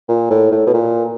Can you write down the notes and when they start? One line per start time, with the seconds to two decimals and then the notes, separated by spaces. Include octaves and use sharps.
0.09 A#2
0.31 A2
0.52 A2
0.67 B2
0.74 A#2